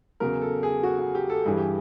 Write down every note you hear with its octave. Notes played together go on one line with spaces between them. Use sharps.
E2 C#3 F#3 A#4
A4
G#4
F#4
F#4
G4
A4
G2 E3 G3 G#4
G4